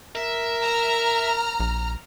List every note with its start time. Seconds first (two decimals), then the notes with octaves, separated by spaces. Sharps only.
0.15 A#4 E5
0.62 A#5 F6
1.60 A#1